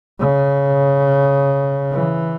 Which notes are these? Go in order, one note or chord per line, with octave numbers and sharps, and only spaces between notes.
C#3
E3